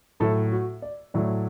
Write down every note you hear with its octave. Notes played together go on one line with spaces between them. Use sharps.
A2 F#3 A3 A4
F#4
D5
A2 F#3 A3 D5